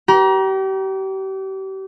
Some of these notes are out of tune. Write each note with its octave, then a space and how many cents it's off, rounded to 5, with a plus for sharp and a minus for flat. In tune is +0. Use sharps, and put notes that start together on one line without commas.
G4 -35 A#5 +30